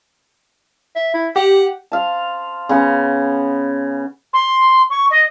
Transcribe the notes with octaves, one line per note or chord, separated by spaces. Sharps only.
E5
E4
G4 F#5
C5 F5 A5
C#3 B3 F#5
C6
C#6
D#5